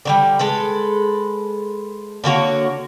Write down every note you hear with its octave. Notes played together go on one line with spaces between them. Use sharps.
D3 F#3 G3
G#3 A4 B4
D3 A#3 F#4 C#5